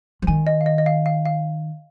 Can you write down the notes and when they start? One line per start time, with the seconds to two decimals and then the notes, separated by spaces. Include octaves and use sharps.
0.22 F3
0.27 D#3 G#5
0.47 D#5
0.61 F5
0.66 D#5
0.78 D#5
0.86 F5
1.06 F5
1.25 F5